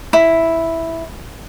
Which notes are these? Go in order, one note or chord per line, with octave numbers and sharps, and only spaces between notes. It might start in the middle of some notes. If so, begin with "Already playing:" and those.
E4